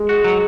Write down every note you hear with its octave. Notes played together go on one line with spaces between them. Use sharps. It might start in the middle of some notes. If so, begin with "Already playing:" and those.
Already playing: G#3
F#4
F#3